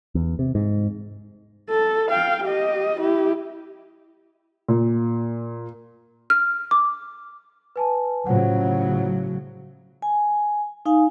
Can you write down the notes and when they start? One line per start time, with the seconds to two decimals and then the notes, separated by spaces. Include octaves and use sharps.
0.15 E2
0.39 C3
0.55 G#2
1.70 A4
2.10 F5 G5
2.44 G4 D#5
2.99 E4 G4
4.68 A#2
6.30 F6
6.71 D6
7.76 B4 G#5 A5
8.27 A2 C#3 F#3 F4 C5 F#5
10.02 G#5
10.86 D#4 F5 G#5